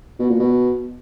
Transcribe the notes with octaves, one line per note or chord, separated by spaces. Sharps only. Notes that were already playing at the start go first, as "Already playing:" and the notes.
B2
A#2
B2